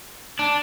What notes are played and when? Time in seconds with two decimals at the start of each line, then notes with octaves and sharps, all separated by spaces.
0.39 D4